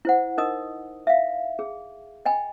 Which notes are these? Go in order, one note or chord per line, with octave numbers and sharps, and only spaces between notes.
E4 C5 F#5
D#4 A#4 D#5 D#6
E5 F5
G#4
D#5 G5 G#5 B5